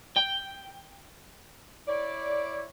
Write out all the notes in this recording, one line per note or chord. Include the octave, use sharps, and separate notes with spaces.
G5
E4 C#5 D5